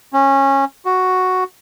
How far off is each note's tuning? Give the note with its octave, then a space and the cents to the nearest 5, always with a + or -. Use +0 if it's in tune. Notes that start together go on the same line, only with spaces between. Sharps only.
C#4 -20
F#4 +0